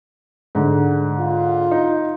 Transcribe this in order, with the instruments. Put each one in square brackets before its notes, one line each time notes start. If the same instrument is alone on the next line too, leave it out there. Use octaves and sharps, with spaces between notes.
[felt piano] G#2 D3
[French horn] F4
[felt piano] D#4